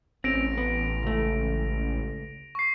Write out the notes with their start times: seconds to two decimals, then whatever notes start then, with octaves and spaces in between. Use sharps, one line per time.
0.24 A1 C4 C#4 A#6 D7 F7
0.58 B3
1.03 C#2 A3
2.55 C#6 C7